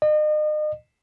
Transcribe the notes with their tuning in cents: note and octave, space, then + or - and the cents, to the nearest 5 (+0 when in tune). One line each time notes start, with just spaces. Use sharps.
D#5 -40